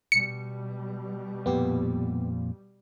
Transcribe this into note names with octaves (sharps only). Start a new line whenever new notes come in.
B2 G3 C#7
F2 A#2 B3 G4